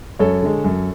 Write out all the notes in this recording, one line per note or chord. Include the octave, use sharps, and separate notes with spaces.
F#2 A4 C#5
D3 G#3
F#2